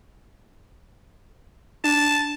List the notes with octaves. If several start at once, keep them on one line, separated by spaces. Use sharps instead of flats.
D4 A5